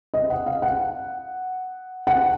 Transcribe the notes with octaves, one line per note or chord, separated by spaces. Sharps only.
D#5
F#5
F5
F#5
F#5